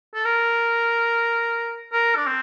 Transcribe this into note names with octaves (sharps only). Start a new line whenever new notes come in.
A4
A#4
A#4
D4
C4